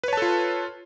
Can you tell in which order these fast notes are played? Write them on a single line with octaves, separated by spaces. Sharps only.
B4 C#5 A5 A4 F4